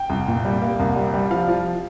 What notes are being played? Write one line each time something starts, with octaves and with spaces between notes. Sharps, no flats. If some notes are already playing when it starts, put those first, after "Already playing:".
Already playing: G5
C2
A#2
G3
A#3
C2
G3
G3
F3 F5
F3